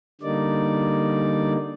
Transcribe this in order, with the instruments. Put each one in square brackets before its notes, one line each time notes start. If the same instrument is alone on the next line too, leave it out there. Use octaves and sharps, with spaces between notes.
[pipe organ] D3 G3 A#3 D#4 D5